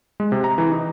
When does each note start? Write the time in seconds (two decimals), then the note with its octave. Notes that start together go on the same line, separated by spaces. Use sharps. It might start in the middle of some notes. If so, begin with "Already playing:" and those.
0.20 G#3
0.32 C3
0.44 A#5
0.58 E3
0.71 D#4